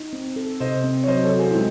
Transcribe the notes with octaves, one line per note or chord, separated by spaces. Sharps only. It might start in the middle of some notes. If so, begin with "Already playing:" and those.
Already playing: D#4
C4
A4
C3 C5 D#5
C4
C#5
F#3 C5 D#5
A4 C#5
F#4
G#4 C5
E4
G#3 C4 D#4